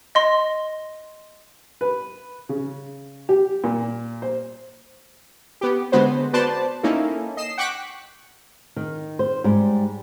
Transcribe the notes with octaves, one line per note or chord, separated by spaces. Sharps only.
D#5 C6 A#6
B4
C#3
G4
A#2
C5
B3 G4
D3 G#3 B3 F#4 B4 C5
B3 F#4 B4 C5 D5 A5
A#3 C#4 D#4 E4 A4
D#5 C7 E7
F#5 G5 C#6 D6 F#6 B6
D#3
C5
G#2 G3